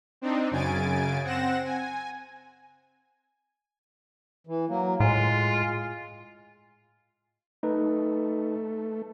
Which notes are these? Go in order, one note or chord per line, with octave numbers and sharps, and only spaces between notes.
C4 D4 D#4
F#2 C#3 G#5 A6 D7
C4 F#5 A#6 E7
G#5
E3
F#3 A#3
A2 G#3 F4
A3 D#4 B4